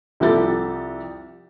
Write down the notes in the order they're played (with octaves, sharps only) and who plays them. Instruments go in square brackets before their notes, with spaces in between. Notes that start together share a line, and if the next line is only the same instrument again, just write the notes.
[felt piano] C2 F3 G4 A4 A6